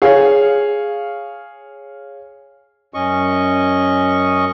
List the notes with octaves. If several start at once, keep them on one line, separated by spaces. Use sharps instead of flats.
G#4 C#5 F5
F#2 C#4 D#5 C#6